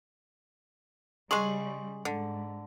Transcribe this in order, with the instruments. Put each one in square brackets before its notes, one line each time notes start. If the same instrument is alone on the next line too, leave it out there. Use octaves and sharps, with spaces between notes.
[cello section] C#3 G3 [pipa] G#3 G#4 [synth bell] C6 C#6 F#7
[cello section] G#2 [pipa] D3